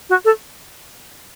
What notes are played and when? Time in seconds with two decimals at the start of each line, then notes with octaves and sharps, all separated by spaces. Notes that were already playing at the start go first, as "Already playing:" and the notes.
0.10 F#4
0.25 A4